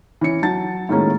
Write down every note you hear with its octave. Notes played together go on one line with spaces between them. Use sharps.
E3 C#4 C#7
F#3 A5 A6
A2 D#3 G#3 A#3 C#4